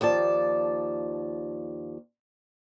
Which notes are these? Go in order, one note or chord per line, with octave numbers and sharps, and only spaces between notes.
D#2 F3 D5 A5